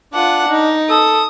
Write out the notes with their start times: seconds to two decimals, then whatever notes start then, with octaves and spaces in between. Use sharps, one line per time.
0.14 D4 F4 F#5
0.49 D#4
0.90 A4 D#6